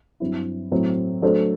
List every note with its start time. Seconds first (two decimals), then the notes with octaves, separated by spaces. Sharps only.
0.20 G2 F#3 C4 E4
0.71 A2 F#3 A3 C4 E4
1.22 F#3 A3 D4 A4 C5